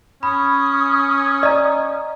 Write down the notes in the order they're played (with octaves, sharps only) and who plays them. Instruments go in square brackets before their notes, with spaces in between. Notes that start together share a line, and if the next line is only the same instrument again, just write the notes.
[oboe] C#4 [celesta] B5 [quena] D#6
[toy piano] D5 [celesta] D#5 A#5